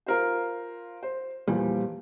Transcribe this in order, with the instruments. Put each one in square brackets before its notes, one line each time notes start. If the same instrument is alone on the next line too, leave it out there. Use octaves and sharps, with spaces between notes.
[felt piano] F4 A#4 C5
C5
[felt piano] E2 F3 [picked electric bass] A#2 G3